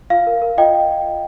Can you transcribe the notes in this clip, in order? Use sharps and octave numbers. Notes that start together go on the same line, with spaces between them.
F4 F5
A#4
A#4
F4 D#5 G5